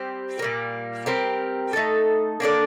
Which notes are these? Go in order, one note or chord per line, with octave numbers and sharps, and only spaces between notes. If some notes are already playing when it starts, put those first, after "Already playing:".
Already playing: G3 C4 G4 C5
A#2 G3 A#3
G3 C4 G4 A#4
A3 D#4 A4
A#3 D4 A4 D5